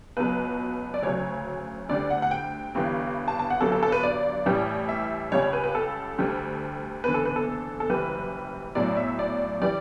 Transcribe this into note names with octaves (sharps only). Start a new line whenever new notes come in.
C#2 B2 F#3 B4
D5
D2 C#3 F#3 C#5
D2 D3 G3 D5
F#5
F#5
G5
G1 G2 E3 G3
A5
A5
F#5
G1 G2 F#3 A4
A4
A4
B4
D5
A1 A2 E3 G3
E5
C#2 C#3 G3 C#5
C#5
B4
B4
A4
D2 D3 G3
F#1 E2 D3 B4
A4
B4
A4
A4
F#1 F#2 E3 G3 B4
B1 A2 F#3 D5
E5
D5
E3 G3 D5